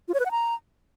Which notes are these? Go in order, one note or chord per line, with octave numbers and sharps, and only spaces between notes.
F4
C#5
B4
F#5
A#5